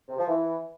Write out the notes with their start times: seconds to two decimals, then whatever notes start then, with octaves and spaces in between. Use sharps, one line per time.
0.09 C3
0.18 F3
0.27 E3